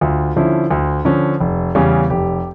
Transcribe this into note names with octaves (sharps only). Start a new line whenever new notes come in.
D2 F4
D3 F3 C#4 E4
D2
D3 F3 C#4
F1
E2 C#3 G3 C#4
F1 G4